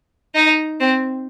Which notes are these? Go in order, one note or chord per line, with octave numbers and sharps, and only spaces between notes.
D#4
C4